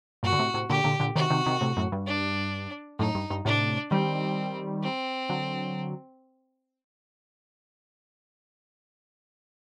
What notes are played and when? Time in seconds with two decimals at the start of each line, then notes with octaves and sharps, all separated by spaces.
0.23 G2 A#2 F#4
0.32 D3
0.39 A2 C3
0.54 A2 C3
0.70 A#2 D3 G4
0.84 A#2 D3
1.00 A#2 D3
1.16 C3 D#3 F#4
1.30 C3 D#3
1.46 C3 D#3
1.61 A2 C3
1.77 F#2 A2
1.92 G2
2.07 D4
2.99 F#2 A2 D#4
3.15 G2
3.30 G2
3.45 A2 C3 D4
3.91 D#3 G3 C4
4.83 C4
5.29 D3 F#3